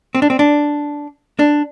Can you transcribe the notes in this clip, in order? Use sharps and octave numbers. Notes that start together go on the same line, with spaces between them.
C4
D4
C4
D4
D4